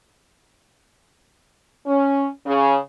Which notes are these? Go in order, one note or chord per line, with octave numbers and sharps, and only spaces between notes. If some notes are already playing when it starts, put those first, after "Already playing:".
C#4
C#3